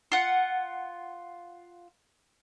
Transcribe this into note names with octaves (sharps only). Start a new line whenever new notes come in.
F4 F#5